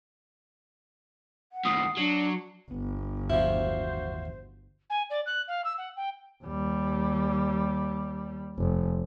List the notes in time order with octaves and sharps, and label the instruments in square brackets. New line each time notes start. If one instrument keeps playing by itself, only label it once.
[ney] F#5
[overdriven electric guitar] D#2 A2 [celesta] D#6 C7
[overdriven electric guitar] F#3 [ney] D4 [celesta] C7 C#7
[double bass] G1 [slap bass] B3
[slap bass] D#2 A2 E3 [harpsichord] F3 E4 [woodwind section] F#4 C5
[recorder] G#5
D5
F#6
F5
E6
F#5
G5
[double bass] D#2 G3
F1